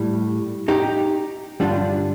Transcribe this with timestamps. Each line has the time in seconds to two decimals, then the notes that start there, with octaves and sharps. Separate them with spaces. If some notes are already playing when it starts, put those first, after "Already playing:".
Already playing: A2 G3
0.68 D#4 G4
1.60 G2 D3 G3 D4 F4